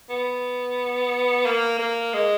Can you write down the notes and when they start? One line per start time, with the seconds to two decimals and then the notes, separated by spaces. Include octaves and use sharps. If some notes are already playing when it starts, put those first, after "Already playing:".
0.10 B3
1.46 A#3
1.79 A#3
2.14 G#3